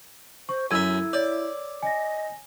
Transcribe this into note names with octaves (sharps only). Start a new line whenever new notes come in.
C5 C#6
F#2 E4 A4 E5 A#5 E6 G#6 D#7
C#5 D5
D#5 G#5 A#6